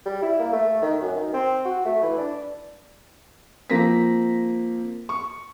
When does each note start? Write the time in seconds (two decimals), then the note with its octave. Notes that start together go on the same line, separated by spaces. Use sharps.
0.05 G3
0.22 E4
0.39 A#3
0.52 A3
0.82 D#3
1.01 F#2
1.16 D#3
1.33 C4
1.65 F#4
1.85 A3
2.02 E3
2.17 D4
3.70 F3 A#3 C4 A#6 B6
5.09 C#6